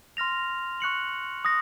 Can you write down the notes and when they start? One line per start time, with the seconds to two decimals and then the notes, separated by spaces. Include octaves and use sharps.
0.17 C6 F6 A#6 F7
0.80 C#6 F#6 C#7 F#7
1.45 D#6 A#6